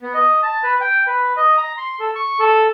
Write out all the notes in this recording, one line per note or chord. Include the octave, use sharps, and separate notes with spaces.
B3
D#5
A5
B4
G5
B4
D#5
A#5
C6
A4
C#6
A4